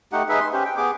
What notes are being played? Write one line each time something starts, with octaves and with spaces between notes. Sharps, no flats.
A3 D#4 G4 F#5
D#4 G#4 B4 E5
C6
C#4 G4 C5
G5
B3 G#4 D6